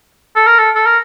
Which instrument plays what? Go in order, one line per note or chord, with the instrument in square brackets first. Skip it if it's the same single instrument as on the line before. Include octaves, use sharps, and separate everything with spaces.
[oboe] A4
A#4
A4
A4
A#4